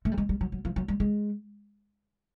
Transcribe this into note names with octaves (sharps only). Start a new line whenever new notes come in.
A3
G3
G#3
G3
F#3
F#3
F3
F#3
G3
G#3